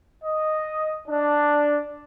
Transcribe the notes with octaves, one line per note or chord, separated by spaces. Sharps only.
D#5
D4